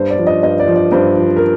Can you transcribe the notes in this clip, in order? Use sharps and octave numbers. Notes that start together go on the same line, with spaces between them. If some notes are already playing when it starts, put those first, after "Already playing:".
Already playing: G2 C5
D5
F3
D#5
G2 D#5
D5
F3
D5
G2 C5
F3
A#4